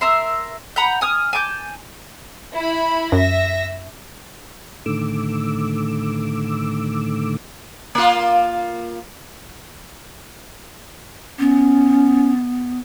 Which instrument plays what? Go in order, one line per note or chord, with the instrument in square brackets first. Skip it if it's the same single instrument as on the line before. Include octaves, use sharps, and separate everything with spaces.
[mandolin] A#4 E5 C6
F#5 A#5 B5 G6
G#5 D#6 F6
G#5 A5 D6 G6
[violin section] E4 B5
[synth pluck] F#2 [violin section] E5 A#6
[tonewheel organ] A2 D3 D#3 A3 D6 E6
[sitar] A#3 F4
[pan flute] B3 [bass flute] C#4